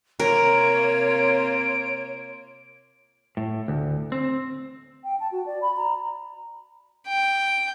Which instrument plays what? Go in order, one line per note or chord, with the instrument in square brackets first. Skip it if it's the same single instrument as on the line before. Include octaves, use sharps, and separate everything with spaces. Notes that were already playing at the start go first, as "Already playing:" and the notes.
[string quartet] C3 A#3 F4 [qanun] A#4 [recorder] C#5 [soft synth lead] D7
[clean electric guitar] A2
D2
C4
[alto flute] G5
A5
F#4
D5
B5
A#5
[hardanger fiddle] G5